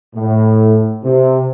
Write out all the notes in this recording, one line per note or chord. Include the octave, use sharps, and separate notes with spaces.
A2
C3